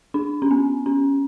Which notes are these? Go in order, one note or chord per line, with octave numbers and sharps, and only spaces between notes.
D4
C#4
B3
C#4